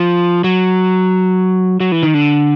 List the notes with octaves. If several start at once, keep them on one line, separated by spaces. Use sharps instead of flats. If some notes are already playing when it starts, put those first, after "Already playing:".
Already playing: F3
F#3
F#3
E3
D#3
D3